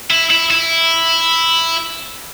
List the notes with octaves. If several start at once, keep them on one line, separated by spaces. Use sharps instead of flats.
E4
E4
E4